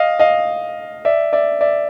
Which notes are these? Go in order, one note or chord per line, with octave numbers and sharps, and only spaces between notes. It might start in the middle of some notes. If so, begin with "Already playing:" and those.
Already playing: D#5 F5
D#5 F5
D5 E5
D5 E5
D5 E5